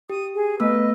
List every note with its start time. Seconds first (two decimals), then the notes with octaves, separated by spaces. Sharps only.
0.10 G4 D#6
0.36 G#4
0.60 A3 B3 B4 D#5 E6